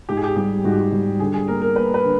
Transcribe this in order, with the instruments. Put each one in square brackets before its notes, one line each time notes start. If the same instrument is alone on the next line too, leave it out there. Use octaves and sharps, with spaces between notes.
[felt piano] G#2 [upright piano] G4
[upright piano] G#4
G4
[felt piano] G3 [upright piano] G4
[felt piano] G#2 [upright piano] F#4
[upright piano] G4
F#4
[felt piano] G3
[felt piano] D3 [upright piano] G#4
[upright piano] G#4
[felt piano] A#3 [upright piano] A#4
[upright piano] A#4
[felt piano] A#3 [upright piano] B4
[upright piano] B4
[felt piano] D3